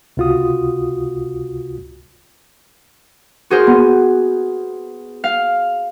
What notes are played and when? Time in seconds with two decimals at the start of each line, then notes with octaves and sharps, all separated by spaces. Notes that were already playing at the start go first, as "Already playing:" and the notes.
0.17 C#2 C3 F4 F#4 D#6
3.50 F#4 G#4 A#4 C5
3.67 B3
5.24 F5